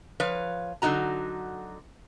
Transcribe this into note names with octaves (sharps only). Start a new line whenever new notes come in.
F3 B4 C#5 F5
D3 F#3 D#4 F#4 A#5